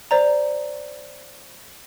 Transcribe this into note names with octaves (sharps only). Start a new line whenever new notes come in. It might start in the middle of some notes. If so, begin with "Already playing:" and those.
C5 D5 A#5